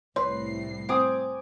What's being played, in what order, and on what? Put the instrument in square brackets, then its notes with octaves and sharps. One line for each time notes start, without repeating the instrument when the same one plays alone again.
[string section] C2 A2 C7 [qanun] B4 [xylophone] C#5 C6
[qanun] C4 [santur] G#5 D6 D#6